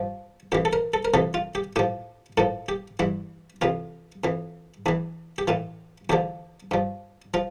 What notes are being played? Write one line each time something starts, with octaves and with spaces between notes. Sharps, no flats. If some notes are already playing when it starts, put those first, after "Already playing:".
Already playing: G2 F3
F2 E3 G4
A4
A#4
A4
A#4
F2 C3 E3 A4
F4
G4
A2 F3 G4
A2 F3 A4
G4
G2 E3 E4
F2 C3 E3 F4
F2 E3
E2 E3 D4
G4
A2 E3 F4
E2 D3 F3 G4
G2 F3
F3 F4